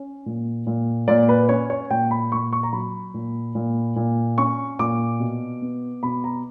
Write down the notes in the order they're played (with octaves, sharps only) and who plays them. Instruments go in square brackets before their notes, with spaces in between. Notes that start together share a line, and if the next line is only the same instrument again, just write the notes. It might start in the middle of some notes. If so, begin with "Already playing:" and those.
Already playing: [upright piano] C#4
A#2
A#2
A#2 D5
B4
C#4 C#5
C#5
A#2 G5
B5
A#2 C#6
C#6
A#5
F#3 B5
A#2
A#2
A#2
C#4 C#6
A#2 D6
B2
B3
B2 B5
A#5